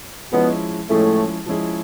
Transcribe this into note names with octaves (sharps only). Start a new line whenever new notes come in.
B2 F3 G#3 B3 C#4 E4 G#4
A2 F3 G#3 A3 C#4 E4 G#4
F3 G#3 C#4 E4 G#4